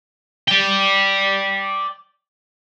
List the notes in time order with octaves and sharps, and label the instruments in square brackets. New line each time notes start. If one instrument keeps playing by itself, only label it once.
[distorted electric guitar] D5 G5